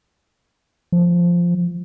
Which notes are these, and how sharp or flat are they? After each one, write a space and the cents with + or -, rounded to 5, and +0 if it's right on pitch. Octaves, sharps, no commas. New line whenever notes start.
F3 -5